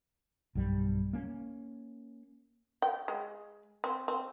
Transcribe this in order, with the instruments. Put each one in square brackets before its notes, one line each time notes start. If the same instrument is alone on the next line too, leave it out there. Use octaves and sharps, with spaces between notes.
[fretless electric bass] B1 G2 G3
A#3 C#4
[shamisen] G5
G#3
C4
C4